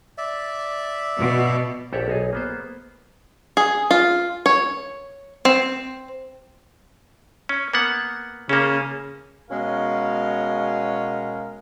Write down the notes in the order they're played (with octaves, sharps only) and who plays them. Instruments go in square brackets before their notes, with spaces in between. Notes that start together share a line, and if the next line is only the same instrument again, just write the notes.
[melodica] D5 E5
[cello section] B2
[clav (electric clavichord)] A#1 G4 A4 C#5 E5 F#5
B1 D#4 G#4
A#3 B3 C5
[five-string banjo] G#4
F4
C#5
C4
[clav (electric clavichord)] C#4
A#3 B3 F#5
[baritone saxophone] C#3 [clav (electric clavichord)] A#3 C#4
[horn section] B2 G#3 C#4 A#4 F5